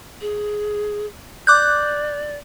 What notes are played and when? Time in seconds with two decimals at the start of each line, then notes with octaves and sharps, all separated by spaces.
0.21 G#4
1.47 D5 D6 F#6 G6